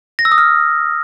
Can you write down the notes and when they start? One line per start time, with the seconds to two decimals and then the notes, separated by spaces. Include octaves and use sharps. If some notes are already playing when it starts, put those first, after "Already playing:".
0.19 A#6
0.25 E6
0.32 D#6
0.38 F6